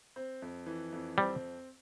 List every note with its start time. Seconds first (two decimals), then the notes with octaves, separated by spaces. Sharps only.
0.16 C4
0.42 F2
0.66 E3
0.92 F2
1.18 G3 C4